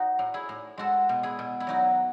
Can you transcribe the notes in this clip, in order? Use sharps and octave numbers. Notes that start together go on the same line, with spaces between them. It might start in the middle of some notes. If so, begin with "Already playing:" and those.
Already playing: D#4 F#4
A2
E4 G#4
A2
G#3 F#4 A4
B2
E4 G#4
B2
E4
F#3 D#4 F#4